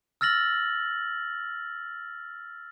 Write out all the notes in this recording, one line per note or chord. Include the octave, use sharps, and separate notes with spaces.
E6 F6 A6 A#6 F#7